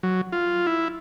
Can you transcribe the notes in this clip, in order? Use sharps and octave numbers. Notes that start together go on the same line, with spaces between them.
F#3
F4
E4